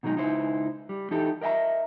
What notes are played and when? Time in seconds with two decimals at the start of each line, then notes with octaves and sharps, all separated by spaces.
0.03 B2 D#3 F#3 G#3 D#4
0.16 C#2 D#4 E4 C5
0.89 G3
1.11 E3 D#4 G4 A4
1.41 A#4 D#5 E5 G5 A#5